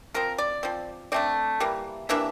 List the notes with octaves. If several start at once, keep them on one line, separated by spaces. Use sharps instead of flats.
F3 C4 A#4
D5
F3 C4
D3 A3 C4 D5
E3 G3 A#3
C3 E3 A#3 D4 E5